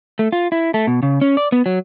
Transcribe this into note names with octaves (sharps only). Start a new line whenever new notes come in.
A3
F4
E4
A3
B2
C#3
C#4
D5
B3
F#3